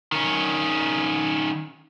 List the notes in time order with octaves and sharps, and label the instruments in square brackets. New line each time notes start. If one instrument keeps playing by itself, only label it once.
[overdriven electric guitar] D#3 C#4